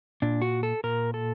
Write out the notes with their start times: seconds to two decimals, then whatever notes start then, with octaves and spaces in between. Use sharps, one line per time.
0.22 A#2 D4
0.42 F#4
0.63 A4
0.84 A#2 A#4
1.14 A4